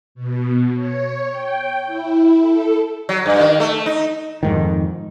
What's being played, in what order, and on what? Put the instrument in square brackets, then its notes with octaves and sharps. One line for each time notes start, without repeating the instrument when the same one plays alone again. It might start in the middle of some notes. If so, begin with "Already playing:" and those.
[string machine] B2
C#5
G5
E4
A4
[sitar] F#3
G2
D#3
A3
D#4
[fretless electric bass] F2 G#2 D#3